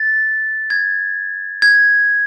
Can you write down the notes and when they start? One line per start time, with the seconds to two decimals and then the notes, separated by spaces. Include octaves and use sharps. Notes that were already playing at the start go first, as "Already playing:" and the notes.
Already playing: A6
0.70 G#6
1.62 G#6